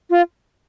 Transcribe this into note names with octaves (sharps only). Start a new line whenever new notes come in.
F4